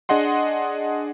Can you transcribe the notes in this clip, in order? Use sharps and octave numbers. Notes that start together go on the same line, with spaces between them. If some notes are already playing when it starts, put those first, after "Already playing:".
D4 G#4 D#5 F#5 C6